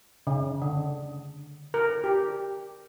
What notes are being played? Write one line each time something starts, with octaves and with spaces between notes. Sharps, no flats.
C#3
D3
A#4
G4